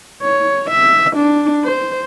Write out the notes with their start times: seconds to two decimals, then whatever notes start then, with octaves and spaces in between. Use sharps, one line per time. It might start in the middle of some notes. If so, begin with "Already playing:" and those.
0.23 C#5
0.70 E5
1.16 D4
1.64 C5